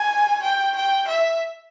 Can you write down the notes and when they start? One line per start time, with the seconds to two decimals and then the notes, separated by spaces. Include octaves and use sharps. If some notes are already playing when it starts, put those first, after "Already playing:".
Already playing: G#5
0.43 G5
0.76 G5
1.08 E5